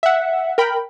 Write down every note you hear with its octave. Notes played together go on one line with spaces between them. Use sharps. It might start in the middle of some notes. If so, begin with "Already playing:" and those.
E5 F#5
A#4 G5 B5